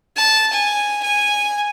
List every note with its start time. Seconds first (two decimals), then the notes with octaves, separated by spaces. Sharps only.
0.16 A5
0.52 G#5
1.03 G#5